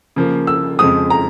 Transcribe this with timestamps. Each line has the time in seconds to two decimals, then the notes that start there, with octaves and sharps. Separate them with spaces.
0.16 C#3 F3 A#3
0.47 E6
0.79 F2 C#3 F3 G#3 C4 D#6
1.10 A#5